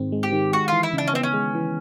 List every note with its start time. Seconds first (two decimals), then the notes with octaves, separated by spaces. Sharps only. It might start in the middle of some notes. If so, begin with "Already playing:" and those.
Already playing: G#2 D#3 G#3 C4
0.12 G#3
0.23 G4
0.33 D#3
0.53 G#3 F#4
0.68 E3 F4
0.83 E4
0.93 C#3
0.98 D4
1.07 C#4
1.14 B3 C4
1.23 C#4
1.34 G#3
1.55 E3